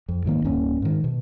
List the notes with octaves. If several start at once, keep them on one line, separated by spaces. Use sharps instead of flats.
F2
B1 G#2 D#3 A#3
D1 G2 A#3 C#4
G#2 D#3
B2